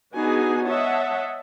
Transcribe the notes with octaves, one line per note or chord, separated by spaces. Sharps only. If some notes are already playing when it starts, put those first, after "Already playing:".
B3 D4 D#4 F#4 G#4 G#5
C#5 D#5 E5 F#5 A5